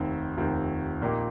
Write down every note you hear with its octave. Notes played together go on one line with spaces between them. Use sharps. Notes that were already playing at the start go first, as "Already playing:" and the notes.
Already playing: F1 D#2 D#3 C4
F1 D#2 D#3 C4
A#1 A#2 A#3 D#4 G4